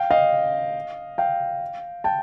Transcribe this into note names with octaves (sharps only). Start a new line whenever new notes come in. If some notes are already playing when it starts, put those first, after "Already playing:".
Already playing: F5 G5
D#5 F5
F5 G5
G5 A5